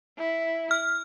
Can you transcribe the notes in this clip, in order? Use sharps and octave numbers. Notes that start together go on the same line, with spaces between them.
E4
F6